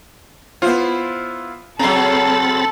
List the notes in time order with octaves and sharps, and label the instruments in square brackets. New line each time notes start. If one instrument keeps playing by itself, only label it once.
[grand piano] B3 F4 [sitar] E4 C5
[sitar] C#3 F#3 [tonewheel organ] C4 B5 A6 [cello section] A4 [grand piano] A#5 C7